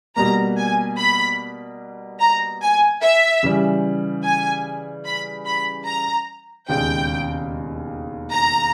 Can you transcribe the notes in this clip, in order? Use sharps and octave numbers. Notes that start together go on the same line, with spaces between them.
B2 G3 A#3 A#5
G#5
B5
A#5
G#5
E5
C#3 E3 G3
G#5
B5
B5
A#5
E1 D#2 C#3 G#3 G5
A#5